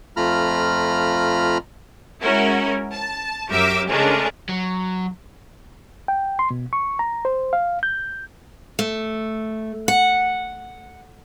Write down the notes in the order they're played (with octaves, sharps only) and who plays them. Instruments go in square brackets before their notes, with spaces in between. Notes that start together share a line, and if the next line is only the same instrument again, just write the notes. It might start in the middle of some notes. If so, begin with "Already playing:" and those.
[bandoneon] F2 A3 F4 A#5 B5 F6
[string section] G#3 C#4 E4 F#4 A#4
A5
F#2 G4 A#4 E5 D6 E6
C#3 G#3 A3 D4 G#4 A#4
[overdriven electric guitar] F#3
[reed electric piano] G5
C6
B2
C#6
A#5
C5
F5
G6
[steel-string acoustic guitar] A3
F#5